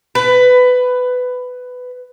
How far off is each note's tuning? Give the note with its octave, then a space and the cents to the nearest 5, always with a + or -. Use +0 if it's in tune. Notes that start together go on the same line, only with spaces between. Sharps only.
B4 +15